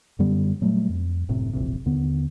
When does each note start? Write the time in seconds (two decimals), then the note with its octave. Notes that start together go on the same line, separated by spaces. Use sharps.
0.19 F#2 D3 G3 B3
0.61 A#2 F#3 G3 A3
0.89 F2
1.29 F#1 A2 C3
1.53 E1 A#1 C3
1.85 D#2 D3 B3